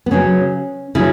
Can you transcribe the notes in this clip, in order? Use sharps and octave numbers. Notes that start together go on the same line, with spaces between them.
B3
C#3 F#3 C#4
C#3 F#3 E4